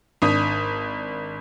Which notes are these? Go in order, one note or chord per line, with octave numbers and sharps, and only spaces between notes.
G#1 D4 D#6 B6